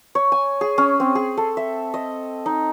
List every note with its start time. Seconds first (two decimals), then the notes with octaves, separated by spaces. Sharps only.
0.15 C#5
0.32 G#5
0.61 G#4
0.78 C#4
1.00 C4
1.15 G#4
1.37 A4
1.57 E5
1.94 D#5
2.46 D#4